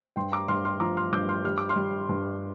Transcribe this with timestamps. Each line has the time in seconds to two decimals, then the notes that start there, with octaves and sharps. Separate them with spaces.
0.16 G2 G5 C6
0.32 A#5 D6
0.48 G2 C6 F6
0.65 C6 F6
0.80 F3 A#5 D6
0.97 C6 F6
1.12 G2 D6 G6
1.29 C6 F6
1.45 G3 F6
1.58 D6
1.69 C6 F6
1.76 G3
2.09 G2